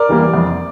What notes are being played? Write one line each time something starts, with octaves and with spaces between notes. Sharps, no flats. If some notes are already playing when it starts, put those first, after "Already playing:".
Already playing: A#4 D5
E3 G3 A#3
F2